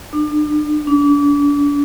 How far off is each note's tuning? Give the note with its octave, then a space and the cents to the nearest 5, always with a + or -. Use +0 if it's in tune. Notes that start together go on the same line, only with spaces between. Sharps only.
D4 +35
D4 -35